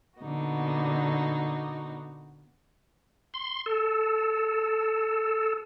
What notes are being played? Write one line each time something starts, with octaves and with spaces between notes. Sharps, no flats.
A#2 D3 B3 D#4 F#4
C6
A4